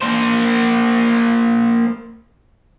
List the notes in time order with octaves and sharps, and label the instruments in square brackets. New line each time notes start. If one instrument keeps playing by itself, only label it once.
[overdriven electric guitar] A#3 C5